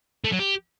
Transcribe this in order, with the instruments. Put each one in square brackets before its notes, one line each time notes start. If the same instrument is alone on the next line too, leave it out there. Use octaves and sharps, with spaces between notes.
[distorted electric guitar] A3
F#3
G4